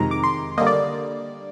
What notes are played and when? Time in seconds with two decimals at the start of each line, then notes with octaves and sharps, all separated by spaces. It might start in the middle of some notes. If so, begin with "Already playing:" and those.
Already playing: F2 C3 D#3 G#3 A#5
0.11 D6
0.23 C6
0.58 D3 G3 A#3 D#5
0.67 D5